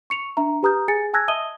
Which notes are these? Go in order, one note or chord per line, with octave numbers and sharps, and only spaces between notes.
C#6 C#7 F7
D4 E5 A#5
G4 B4 A#5 D#6 F6 G6
G#4 G#5 A6 C#7
G#5 A5 E6 F#6 G#6 A#6
D#5 E5 A5 D#6 D#7 G7